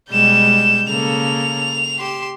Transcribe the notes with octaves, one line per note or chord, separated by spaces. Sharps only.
B2 G3 G#3 G6 E7
C#3 A#3 A4 F7
G4 C6 E7